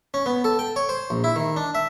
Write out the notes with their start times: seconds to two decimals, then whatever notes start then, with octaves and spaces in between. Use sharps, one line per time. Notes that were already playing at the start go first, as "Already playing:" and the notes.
0.14 C#4
0.26 B3
0.44 A4
0.59 G5
0.76 C#5
0.89 C5
1.10 A#1
1.24 E4
1.36 D#3
1.56 D4
1.75 E5